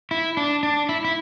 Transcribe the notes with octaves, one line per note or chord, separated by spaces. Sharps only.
E4
D4
D4
E4
E4